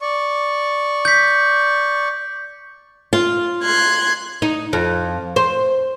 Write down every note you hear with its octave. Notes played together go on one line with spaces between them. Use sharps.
D5 C#6
G6 B6
F4
C6 F#6 G#6
D#4
F2
C5